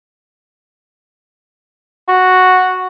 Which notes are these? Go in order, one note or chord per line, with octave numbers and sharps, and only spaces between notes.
F#4